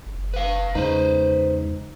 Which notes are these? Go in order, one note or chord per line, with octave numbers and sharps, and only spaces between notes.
F#1
B4 F5
E2 C#3 G#3 D#4 B4 C5